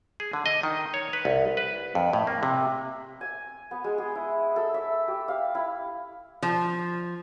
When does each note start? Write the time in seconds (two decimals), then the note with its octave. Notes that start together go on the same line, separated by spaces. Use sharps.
0.20 G#4
0.33 D3
0.46 D#5
0.63 D#3
0.94 C#5
1.13 B4
1.25 C2
1.57 B4
1.95 F2
2.13 A2
2.27 A#3
2.43 C3
3.21 G#5
3.71 B3
3.84 G#3
3.98 G#4
4.15 E4
4.56 A4
4.74 E5
5.08 G4
5.28 F5
5.55 E4
6.42 F3